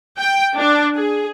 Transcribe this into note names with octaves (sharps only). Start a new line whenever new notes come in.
G5
D4
G#4